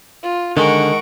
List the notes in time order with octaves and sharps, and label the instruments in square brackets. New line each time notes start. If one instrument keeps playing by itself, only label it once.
[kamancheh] F4
[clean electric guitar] D3 [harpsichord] D#3 G#3 [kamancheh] A#4 F#5 [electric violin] C#6 D7